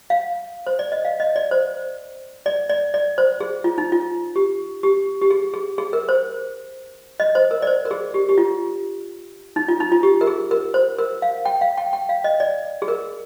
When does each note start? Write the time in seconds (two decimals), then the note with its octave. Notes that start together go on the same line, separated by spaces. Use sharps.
0.10 F5
0.67 C5
0.79 D5
0.92 D#5
1.05 F5
1.20 D#5
1.36 D5
1.51 C5
2.46 D5
2.69 D5
2.94 D5
3.18 C5
3.40 G#4
3.64 F4
3.78 D#4
3.92 F4
4.36 G4
4.83 G4
5.22 G4
5.30 G#4
5.54 G#4
5.78 G#4
5.93 A#4
6.09 C5
7.20 D#5
7.35 C5
7.51 A#4
7.62 D5
7.67 C5
7.85 A#4
7.91 G#4
8.14 G4
8.29 G4
8.38 F4
9.56 D#4
9.68 F4
9.80 D#4
9.92 F4
10.03 G4
10.21 A#4
10.27 G#4
10.51 A#4
10.74 C5
10.99 A#4
11.22 F5
11.45 G5
11.61 F5
11.77 G5
11.93 G5
12.09 F5
12.24 D#5
12.40 D5
12.82 G#4
12.88 A#4